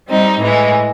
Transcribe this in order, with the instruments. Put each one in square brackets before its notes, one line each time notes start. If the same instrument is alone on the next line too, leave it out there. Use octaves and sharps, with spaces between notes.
[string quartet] G3 C4 D#4
A2 E3 G#3